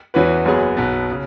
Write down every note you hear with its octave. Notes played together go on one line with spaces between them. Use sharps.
E2 E3 C#4 F#4 B4
F#1 F#2 F#3 B3 G#4
B1 B2 B3
C#3